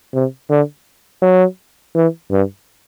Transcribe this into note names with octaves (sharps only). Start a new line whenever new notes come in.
C3
D3
F#3
E3
G2